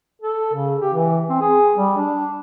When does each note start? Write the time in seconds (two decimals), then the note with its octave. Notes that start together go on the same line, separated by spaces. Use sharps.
0.22 A4
0.54 C#3
0.81 G4
0.94 E3
1.30 C4
1.41 G#4
1.75 G3
1.97 D4